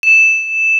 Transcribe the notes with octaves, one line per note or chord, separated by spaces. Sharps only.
E7